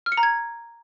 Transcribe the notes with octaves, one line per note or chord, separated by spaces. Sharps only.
F6
C#7
A#5
G#6